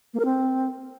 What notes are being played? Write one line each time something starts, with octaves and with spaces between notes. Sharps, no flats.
A#3
A#4
C4